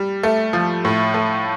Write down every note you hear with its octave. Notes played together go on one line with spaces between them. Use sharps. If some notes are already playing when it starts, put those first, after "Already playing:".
Already playing: G3
A3
F3
A2
A3